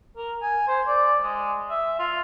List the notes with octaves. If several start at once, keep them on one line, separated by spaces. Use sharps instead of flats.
A#4
G#5
C5
D5
G#3
E5
F4